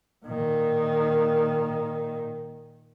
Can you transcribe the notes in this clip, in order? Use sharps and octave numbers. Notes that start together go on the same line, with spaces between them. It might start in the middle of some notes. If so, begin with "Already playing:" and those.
A#2 D#3